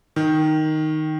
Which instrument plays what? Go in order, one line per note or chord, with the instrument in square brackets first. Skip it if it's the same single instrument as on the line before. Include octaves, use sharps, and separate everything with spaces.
[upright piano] D#3